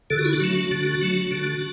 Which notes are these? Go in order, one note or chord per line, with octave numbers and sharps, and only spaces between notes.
D3 A4
F#4
E4
D4 F#4
F#3 A3
D3
F#3 A3
D3